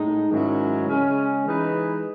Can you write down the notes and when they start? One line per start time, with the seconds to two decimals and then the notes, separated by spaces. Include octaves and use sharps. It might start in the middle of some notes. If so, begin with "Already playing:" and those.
Already playing: A2 G#3 D#4
0.29 G#2 D#3 F#3 C#4 E4
0.87 C#3 G#3 C#4
1.45 E3 G#3 D#4 G#4 B4